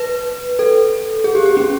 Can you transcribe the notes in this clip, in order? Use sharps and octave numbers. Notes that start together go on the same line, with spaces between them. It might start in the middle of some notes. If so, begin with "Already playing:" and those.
Already playing: B4
A4
G#4
G4
G4
C#4